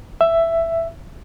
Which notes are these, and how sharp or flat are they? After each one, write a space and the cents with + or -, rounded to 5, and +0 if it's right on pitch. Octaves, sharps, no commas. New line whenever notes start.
E5 +10